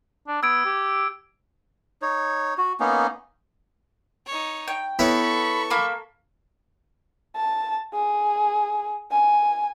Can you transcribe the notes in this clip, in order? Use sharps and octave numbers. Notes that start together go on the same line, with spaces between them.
D4
B3 E6 G#6 D7
G4
D#4 C#5
F#4
A#3 B3 C#4 D#4
D#4 C#5
G5
B3 E4 A4 C#5 B5 C#6
A#3 B5
A5
G#4
G#5